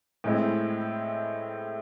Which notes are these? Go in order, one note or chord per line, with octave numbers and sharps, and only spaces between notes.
A2 G#3 C4 E4